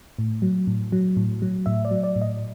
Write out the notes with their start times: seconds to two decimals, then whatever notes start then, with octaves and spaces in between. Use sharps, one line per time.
0.19 A2
0.42 F#3
0.67 A2
0.92 F#3
1.17 A2
1.42 F#3
1.66 A2 E5
1.85 D5
1.91 F#3
2.03 D5
2.16 A2
2.21 D#5